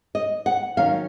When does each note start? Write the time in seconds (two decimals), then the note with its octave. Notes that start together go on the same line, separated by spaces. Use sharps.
0.15 D#5
0.46 F#5
0.77 D#3 F#3 C#4 F5